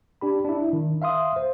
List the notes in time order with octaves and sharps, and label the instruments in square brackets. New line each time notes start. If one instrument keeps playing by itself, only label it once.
[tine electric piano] D4 G4 B5
D4 E4
D#3
E5 F5 C6 D#6
C5